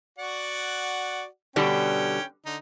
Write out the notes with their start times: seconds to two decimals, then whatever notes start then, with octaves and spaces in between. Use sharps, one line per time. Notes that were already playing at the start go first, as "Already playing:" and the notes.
0.19 F#4 D5 F#5
1.56 B2 D3 G3 C#4 G5
2.46 D3 D#4